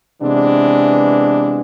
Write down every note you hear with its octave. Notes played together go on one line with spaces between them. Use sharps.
C3 E3 G#3 B3 D4